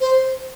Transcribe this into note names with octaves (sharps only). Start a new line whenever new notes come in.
C5